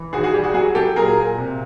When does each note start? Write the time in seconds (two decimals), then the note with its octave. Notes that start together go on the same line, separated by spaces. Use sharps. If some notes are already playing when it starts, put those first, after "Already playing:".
Already playing: E3
0.13 D#2 F#4 G#4
0.23 F#4 G#4
0.33 G3 G4
0.44 F#4 G#4
0.54 F#3 F#4 G#4
0.75 F#3 G4 A4
0.96 A#2 G#4 A#4
1.17 A#2
1.38 C3